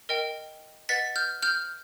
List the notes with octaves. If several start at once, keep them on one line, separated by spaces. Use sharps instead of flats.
A#4 D#5 G5
B4 D#5 F#5 A6 B6
F6 G6
F6 G6